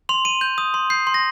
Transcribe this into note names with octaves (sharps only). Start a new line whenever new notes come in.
C6 F7
C6 D#7
G6
D#6
C6
G6 C7
C6
A#6